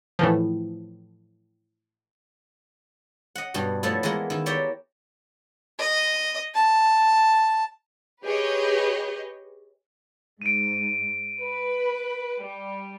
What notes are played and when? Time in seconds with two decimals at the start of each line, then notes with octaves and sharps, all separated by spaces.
0.19 A2 E3 F3
3.35 D#5 F#5
3.54 G2 B2 G3
3.83 A2 F3 A3 B3 E4
4.03 E3 G#3 A#3 B3 A#4
4.30 D#3 E4
4.46 G4 C#5 D5 E5 G5 A#5
5.79 D#5
6.54 A5
8.24 G4 G#4 B4 C#5 D#5
10.42 G#2 D7 D#7
11.42 B4
12.42 G3